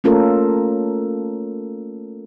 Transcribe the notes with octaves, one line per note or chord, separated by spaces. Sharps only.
A3 A#3 C#4 F4 A4 A#4